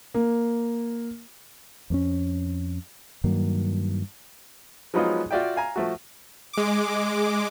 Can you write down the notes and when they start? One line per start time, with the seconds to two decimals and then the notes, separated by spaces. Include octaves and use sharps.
0.14 A#3
1.90 F2 A#3 C#4
3.24 G2 D#3 F#3 A#3
4.94 F3 F#3 G#3 B3 D#4 F4
5.31 F4 F#4 D5 E5 G5
5.56 F5 G#5 A#5
5.76 F3 A3 F#4
6.53 G#3 D6